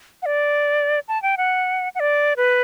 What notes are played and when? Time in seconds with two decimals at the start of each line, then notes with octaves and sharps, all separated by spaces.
0.22 F#5
0.26 D5
1.08 A5
1.23 G5
1.37 F#5
1.95 F#5
2.00 D5
2.37 B4